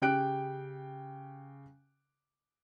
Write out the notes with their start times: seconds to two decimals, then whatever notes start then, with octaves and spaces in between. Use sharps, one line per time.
0.02 C#3 G4 G5 F#6 D7